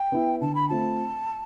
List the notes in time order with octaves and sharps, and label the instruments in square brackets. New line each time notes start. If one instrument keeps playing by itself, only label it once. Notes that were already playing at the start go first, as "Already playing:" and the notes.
Already playing: [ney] G5
[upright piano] B3 E4
[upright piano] D3 [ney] A5
[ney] B5
[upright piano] A3 C4 F4 [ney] A5